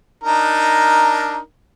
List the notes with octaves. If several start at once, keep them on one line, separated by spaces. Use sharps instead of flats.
D4 D#4 A#4